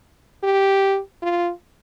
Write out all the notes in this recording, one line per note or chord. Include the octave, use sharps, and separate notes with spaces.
G4
F4